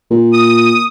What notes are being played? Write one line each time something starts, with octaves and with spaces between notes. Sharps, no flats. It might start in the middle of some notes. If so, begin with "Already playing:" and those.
A#2
D#6